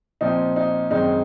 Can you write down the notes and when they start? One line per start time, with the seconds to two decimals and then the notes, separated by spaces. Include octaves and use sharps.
0.21 A#2 F3 C4 D#4
0.56 D#4
0.90 F#2 D#3 G#3 C4 D#4